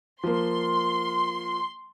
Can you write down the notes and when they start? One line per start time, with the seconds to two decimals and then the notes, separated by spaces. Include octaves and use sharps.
0.24 F3 A#3 C6